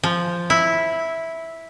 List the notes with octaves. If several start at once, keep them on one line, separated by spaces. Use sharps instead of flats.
F3
E4